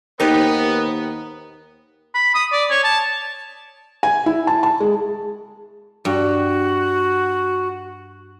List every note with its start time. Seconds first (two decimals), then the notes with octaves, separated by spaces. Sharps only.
0.20 D#2 B3 D#4 G4 A#4 C5
2.14 B5
2.34 D#6
2.52 D5
2.70 C#5
2.84 A5
4.03 G#5
4.26 E4
4.47 A5
4.63 A5
4.80 G#3
6.05 G2 F#4